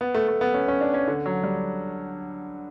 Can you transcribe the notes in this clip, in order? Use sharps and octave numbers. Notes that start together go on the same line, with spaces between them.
B3
A3
A3
B3
C#4
C#4
D4
C#4
D3
F#3
G3